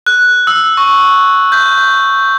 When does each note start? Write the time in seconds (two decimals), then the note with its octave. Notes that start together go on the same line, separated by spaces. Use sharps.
0.07 F#6
0.47 E6
0.77 C#6
1.52 G6